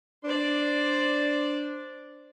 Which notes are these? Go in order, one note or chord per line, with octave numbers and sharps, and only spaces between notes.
D4 C5 D5